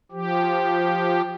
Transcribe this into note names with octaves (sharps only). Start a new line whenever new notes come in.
F3 G4